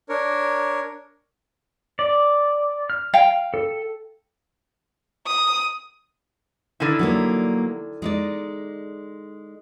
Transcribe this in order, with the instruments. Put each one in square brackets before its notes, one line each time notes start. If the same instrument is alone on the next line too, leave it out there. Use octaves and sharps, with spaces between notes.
[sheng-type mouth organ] D4 A#4 C#5
[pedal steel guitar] D5
F6
[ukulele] F5 G5
[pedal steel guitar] A4
[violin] D#6
[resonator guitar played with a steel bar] D3 D#3 E4
[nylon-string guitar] F#3 G3 A#3
G#3 D#4 D5